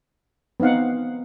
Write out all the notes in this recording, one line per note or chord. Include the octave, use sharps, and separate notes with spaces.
B3 C4 D#4 F5 F#5